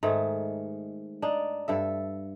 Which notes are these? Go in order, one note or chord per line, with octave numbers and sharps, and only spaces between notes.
G#2 D#3 A3 G#4
D4 D#4
G2 A4 E5